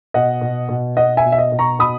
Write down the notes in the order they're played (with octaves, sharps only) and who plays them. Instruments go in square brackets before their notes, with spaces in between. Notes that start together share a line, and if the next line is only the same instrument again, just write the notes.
[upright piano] B2 D#5 F#5
B2
B2
B2 D#5 F#5
E5 G#5
B2
E5
D#5
B2
A#5 C#6
B2 B5 D#6